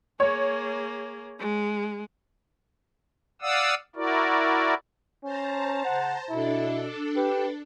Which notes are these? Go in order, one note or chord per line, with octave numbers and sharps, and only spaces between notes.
A#3 G#4 C#5
G#3
D5 F5 F#5 D#6 E6
E4 F#4 A#4 D5
C#4 C5 A5 A#5
C#3 F#5
B2 D4 E4 A4
G4 B4